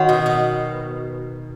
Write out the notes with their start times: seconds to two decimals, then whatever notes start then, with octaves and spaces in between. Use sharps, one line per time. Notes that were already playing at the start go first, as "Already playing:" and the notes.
Already playing: D#3 F#4 C#5 F#5 C#6
0.09 B2
0.26 B2